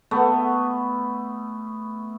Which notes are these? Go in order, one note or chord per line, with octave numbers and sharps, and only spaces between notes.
A3 B3